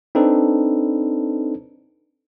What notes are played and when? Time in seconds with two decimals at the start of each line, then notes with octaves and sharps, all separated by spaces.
0.15 C4 D4 D#4 A4 B4